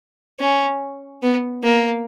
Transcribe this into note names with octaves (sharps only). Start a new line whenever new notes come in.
C#4
B3
A#3